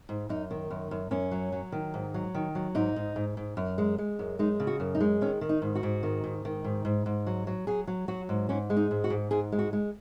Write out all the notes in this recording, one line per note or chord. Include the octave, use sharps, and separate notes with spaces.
G#2
F#2 D#4
D#3
F#2
F#2
F#2 C#4
F#3
F#3
D#3
G#2
F#3
D#3
F#3
G#2 D#4
G#2
G#2
G#2
F#2
G#3
G#3
F#2
G#3 D#4
C#3
F#4
F#2
D#4
G#3
D#3 C#4
D#3
D#4
G#2
F#4
G#2
D#3
G#2
D#3
G#2
G#2
G#2
F#3
F#3
F#3 G#4
F#3
F#3 F#4
G#2
G#2 C#4
G#3
D#4
G#2
F#4
G#2
G#2 G#4
G#3
F#4
G#3